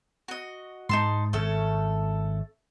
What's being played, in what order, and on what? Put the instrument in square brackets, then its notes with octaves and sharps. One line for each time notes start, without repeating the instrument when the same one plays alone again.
[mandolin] F#4 D#5
[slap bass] G#2 G#3 [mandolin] D#4 A5 C6
[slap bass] G#1 G#2 [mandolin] A3 C#4 A4